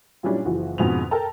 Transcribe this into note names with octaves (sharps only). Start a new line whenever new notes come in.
A#2 F#3 G3 C#4 D4 E4
F#1 E3 F3 F#4
F2 G#2 B2 D3 F7
A4 A#4 G5 A5 A#5